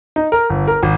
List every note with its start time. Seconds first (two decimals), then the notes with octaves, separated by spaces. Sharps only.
0.16 D#4
0.32 A#4
0.50 G1
0.67 A#4
0.83 G#1